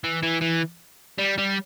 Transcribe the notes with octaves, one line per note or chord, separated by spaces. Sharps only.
E3
E3
E3
G3
G3